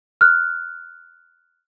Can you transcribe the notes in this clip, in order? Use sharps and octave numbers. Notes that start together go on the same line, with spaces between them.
F6 F#6